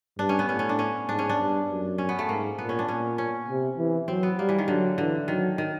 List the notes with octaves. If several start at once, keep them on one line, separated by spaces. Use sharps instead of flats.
G2 D4
C#4
B3
A2 C#4
C#4
D4
C#4
G#2 D4
C#4
D4
G2
F#2
C#4
B3
A3
G#2 A#3
A#2 B3
C#4
D4
A#2 C#4
C#4
C3
E3
F#3 C4
B3
G3 A#3
E3
D#3
D3 F#3
D3 E3
D#3 F#3
D#3